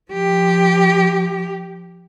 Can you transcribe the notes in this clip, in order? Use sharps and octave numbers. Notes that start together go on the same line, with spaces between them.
F3 G4